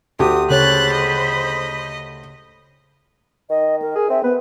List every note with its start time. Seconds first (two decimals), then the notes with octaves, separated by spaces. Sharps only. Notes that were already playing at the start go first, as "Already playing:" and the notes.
0.19 D2 G4 D#6
0.50 C#3 A4 C5 C#5 B5 F#6 A6
0.92 D#5
3.50 D#3 D#5
3.82 A#4
3.95 G#4
4.10 C4 E5
4.24 B3 B4